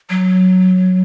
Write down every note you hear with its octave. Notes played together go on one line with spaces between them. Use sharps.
F#3